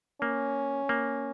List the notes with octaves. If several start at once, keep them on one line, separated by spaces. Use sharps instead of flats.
A#3 C#4
A#3